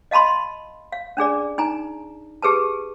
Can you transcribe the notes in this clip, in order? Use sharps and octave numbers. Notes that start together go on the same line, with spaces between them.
D#5 F5 A5 B5 C6
F5
C#4 D4 G#4 D5
D#4 G#5 A#5
G4 G#4 B4 A5